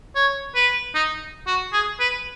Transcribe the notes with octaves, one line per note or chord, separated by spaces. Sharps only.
C#5
B4
D#4
F#4
G#4
B4